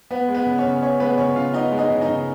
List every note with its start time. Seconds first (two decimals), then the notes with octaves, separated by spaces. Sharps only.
0.11 B3 B4
0.28 G#3
0.35 B3 B4
0.46 C#3
0.58 C#4 C#5
0.65 C#3
0.82 B3 C#4 C#5
1.00 G#3 B3 B4
1.18 C#3 C#4 C#5
1.36 C#3 F4 F5
1.54 B3 D#4 D#5
1.72 G#3
1.78 D#4 D#5
1.90 C#3
2.01 D#4 D#5
2.08 C#3